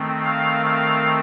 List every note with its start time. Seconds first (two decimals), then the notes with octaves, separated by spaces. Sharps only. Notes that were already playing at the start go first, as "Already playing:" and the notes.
Already playing: D#3 A3 C4
0.25 F5
0.66 F5